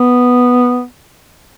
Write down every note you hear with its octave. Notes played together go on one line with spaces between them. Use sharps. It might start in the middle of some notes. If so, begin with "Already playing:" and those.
Already playing: B3